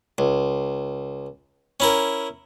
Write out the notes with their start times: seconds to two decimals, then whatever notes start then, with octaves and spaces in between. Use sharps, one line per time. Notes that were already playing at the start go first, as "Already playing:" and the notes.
0.18 C#2
1.80 C#4 E4 A#4